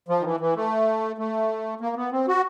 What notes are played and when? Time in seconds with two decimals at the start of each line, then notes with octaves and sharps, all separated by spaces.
0.09 F3
0.20 D#3
0.25 E3
0.40 E3
0.56 A3
1.18 A3
1.81 A#3
1.96 B3
2.12 C4
2.28 F#4